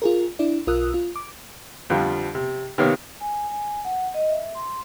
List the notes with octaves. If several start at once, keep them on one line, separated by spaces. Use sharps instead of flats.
F4 G#4 A#4
D4 E4 D5
B1 F4 A#4 D#6 E6 F#6
F4
D6
F2 D3 F3 G3
C3
C3 D#3 A#3 B3 C#5 F5
G#5
G#5
F#5
D#5
E5
C6